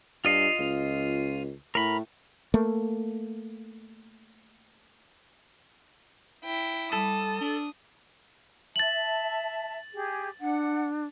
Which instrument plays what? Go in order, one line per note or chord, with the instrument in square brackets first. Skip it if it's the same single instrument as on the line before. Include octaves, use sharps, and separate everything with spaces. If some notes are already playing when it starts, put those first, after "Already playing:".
[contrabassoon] G2 [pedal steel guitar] F4 D#5 F5
[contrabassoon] C#2
[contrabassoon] A2 [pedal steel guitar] A#4 B5
[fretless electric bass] A3 A#3
[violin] E4 G5
[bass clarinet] G3 [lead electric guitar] A4 [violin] D#6
[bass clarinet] D4
[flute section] E5 A5 [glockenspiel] A6 F#7
[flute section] G4 G#4
[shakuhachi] D4 [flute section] F#5